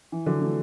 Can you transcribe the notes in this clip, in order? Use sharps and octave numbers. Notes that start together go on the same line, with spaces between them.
E3
D3 F#3
E3 A3